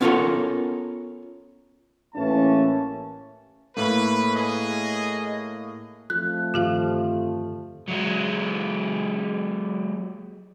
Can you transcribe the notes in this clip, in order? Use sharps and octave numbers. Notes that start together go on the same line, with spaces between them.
B3 C#4 F4 A4 A#4 C#5
A1 E3 A#3 C#4 A5
A2 A#3 B4
G#4 D#5
F2 F3 A3 F#6
G2 D3 D#3 F4 G4 F5
F#3 G#3